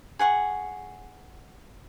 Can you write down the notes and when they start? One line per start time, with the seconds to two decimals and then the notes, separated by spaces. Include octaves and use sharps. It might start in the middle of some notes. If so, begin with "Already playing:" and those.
0.19 G#4 F#5 C#6